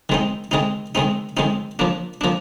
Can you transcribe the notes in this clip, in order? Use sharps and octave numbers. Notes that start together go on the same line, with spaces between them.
D#3 G#3 C4 D#4
D#3 G#3 C4 D#4
D#3 G#3 C4 D#4
D#3 G#3 C4 D#4
F3 A#3 D4
F3 A#3 D4